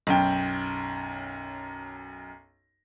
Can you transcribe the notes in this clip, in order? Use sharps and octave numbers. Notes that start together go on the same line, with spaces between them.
B1 F#2 G5